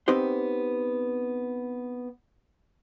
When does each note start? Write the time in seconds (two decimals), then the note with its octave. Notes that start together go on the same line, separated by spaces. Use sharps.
0.08 B3 C4 D#4 G4 C5